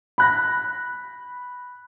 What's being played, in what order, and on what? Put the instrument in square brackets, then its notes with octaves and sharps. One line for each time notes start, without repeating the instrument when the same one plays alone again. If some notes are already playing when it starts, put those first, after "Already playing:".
[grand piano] B5 F#6 A#6